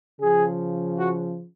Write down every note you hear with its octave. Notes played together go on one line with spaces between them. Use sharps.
C#3 F3 G#4
F#4